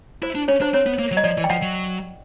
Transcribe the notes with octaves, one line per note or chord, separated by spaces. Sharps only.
E4 C5
D4
C#4 C#5
D4 C5
C4 C#5
B3
A#3
F#3
D#5
F3 D5
E3
G5
F3 F#5
F#3